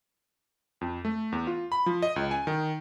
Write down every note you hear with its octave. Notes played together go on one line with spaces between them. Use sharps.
F2
A3
E2
F4
B5
F3
D#5
C#2
G#5
D#3